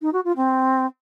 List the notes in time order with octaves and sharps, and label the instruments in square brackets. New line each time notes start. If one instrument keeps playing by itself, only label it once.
[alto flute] D#4
F#4
F4
C4